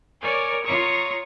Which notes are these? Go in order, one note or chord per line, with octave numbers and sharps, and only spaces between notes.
A#4 C#5 D5 G#5 C#6
F4 C#5 A#5 C#6 D#6